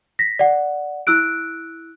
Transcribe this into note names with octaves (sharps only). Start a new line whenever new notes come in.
A#6 B6
D5 F#5
E4 E6 F#6 D7